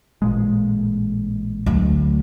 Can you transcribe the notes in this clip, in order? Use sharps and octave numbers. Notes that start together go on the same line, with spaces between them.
A1 A#2 G#3
D2 F#3